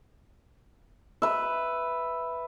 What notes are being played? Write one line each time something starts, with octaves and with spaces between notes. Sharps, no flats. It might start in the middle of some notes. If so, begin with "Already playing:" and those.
B4 E5